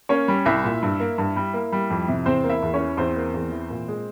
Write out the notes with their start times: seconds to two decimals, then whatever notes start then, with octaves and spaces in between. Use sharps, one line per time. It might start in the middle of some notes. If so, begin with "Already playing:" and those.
0.09 A#3 C#4 C#5
0.28 G3
0.46 C2 E4 E5
0.64 A#2
0.82 G2
1.00 A#3
1.18 G2
1.36 G3
1.53 A#3
1.72 G3
1.90 F2
2.08 C3
2.26 E2 C4 C5
2.44 A#3
2.50 E4 E5
2.62 E2
2.74 C#4 C#5
2.80 E3
2.97 E2 C4 C5
3.16 A#3
3.34 E2
3.51 E3
3.70 A#2
3.88 G#3